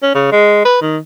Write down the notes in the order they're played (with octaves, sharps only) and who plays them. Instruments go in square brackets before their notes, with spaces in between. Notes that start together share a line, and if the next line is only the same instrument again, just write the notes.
[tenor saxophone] C#4
C#3
G#3
B4
D#3